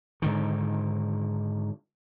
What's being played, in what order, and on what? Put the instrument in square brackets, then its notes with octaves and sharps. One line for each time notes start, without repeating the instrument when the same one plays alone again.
[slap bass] G#2 D3 D#3